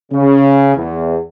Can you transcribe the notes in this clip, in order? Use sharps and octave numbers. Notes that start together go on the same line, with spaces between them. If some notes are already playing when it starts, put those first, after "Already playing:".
C#3
E2